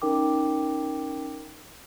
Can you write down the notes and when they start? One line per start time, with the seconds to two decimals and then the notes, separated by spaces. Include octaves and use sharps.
0.02 C#4 D#4 A#4 G5 D6